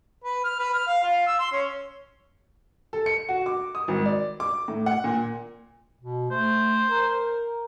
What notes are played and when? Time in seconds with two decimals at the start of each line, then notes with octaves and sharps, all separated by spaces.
0.24 B4
0.44 F6
0.59 B4
0.73 F6
0.87 F5
1.03 F4
1.26 E6
1.40 C6
1.52 C#4
2.93 A4
3.06 C#7
3.29 F#4
3.46 D6
3.75 D#6
3.88 G#1
4.06 D5
4.40 D6
4.68 A2
4.86 F#5
5.04 A#2
6.01 B2
6.31 A3 C5
6.89 A#4